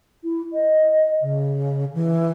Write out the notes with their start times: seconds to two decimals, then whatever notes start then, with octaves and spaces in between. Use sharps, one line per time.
0.24 E4
0.53 D#5
1.22 C#3
1.94 E3